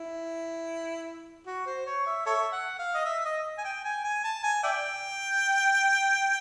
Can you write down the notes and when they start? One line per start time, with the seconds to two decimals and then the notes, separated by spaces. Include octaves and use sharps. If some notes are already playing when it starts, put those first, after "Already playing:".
Already playing: E4
1.46 F#4
1.66 C5
1.86 C#5
2.06 E5
2.26 A4 C#5 E5
2.52 F#5
2.79 F5
2.94 D#5
3.05 E5
3.25 D#5
3.58 G#5
3.64 G5
3.84 G#5
4.04 G#5
4.24 A5
4.43 G#5
4.64 D5 E5 G5